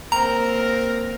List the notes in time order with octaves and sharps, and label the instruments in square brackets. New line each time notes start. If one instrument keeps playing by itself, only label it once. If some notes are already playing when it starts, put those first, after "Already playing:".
[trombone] A#3 [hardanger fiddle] C4 [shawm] A#4 [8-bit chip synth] A#5